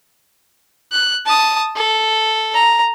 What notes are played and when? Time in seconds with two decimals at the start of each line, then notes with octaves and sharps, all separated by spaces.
0.92 F#6
1.26 A5 D#6
1.76 A4
2.54 A#5